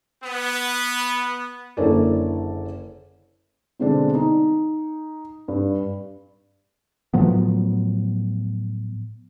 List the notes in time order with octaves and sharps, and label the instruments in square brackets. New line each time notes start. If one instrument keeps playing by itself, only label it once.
[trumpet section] B3
[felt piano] F#1 D3 E4 A#4 C#5 D5
B2 D3 G#3 C4 D4
D#4
G2
[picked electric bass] A2 F3 F#3 B3